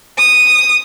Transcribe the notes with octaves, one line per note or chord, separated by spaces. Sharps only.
D#6